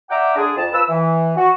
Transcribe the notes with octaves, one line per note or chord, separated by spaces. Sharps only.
D5 E5 F#5 G5 A#5 D6
D3 D4 G#4
F2 A5
F3 B4 E6
E3
F#4